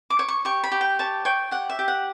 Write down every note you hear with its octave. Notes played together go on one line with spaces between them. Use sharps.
D6
C#5
C#6
G4 C#6
B5
G4
G5
C#5 A5
C#5 G5
G4 F#5
E5
G4
F#5